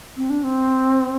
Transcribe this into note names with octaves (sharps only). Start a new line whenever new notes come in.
C4
D4
C4